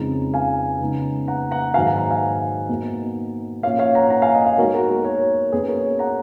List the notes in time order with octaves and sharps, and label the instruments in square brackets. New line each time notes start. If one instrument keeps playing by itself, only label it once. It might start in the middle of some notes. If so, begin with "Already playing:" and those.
Already playing: [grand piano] F2 C#3 G#3 B3 D#4
F5 G#5
C#3 G#3 B3 D#4
F#5 A#5
F#5 A#5
G#2 D#3 F#3 F5 G#5
F#5 A#5
F#5 A#5
F5 G#5
B2 A#3 D#4
A#2 F3 A#3 C#4 C#5 F5
C#5 F5
F#5 A#5
F#5 A#5
F5 G#5
D#5 F#5
C#5 F5
B2 G#3 D#4 F#4 A#4
F#4 A#4
F#4 A#4
A#4 C#5
B2 A#3 C#4 G#4 B4
A#4 C#5
F#5 A#5